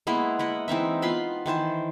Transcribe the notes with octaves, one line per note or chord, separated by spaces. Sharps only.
G#3 A#3 B3 E4
E4 D#5 F#5
E3 C4 D#4 E5
B3 F4 B5 C6
D#3 E3 C5 A5